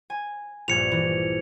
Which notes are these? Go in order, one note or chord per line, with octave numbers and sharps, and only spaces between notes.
G#5
A#1 G2 G#6 C#7 F7
E3